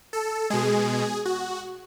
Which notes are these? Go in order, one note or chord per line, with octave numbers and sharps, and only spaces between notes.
A4
B2 G#3 G#4
F#4